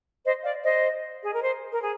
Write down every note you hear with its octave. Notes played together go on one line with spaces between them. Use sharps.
C5 D#5
D5 F5
C5 D#5
G#4
A#4
C5
A#4
G#4